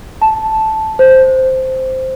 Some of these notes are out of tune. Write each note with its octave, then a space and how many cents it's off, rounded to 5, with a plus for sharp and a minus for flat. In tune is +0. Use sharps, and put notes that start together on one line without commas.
A5 -5
C5 -5